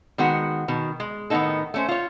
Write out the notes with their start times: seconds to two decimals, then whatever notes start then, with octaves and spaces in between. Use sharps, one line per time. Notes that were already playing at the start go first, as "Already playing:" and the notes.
0.18 D#3 G#3 B3 F#4
0.68 B2 D#3
1.00 G#3
1.30 A2 D#3 A#3 B3 D#4 A4
1.74 A3 C#4 C5
1.88 F4 C#5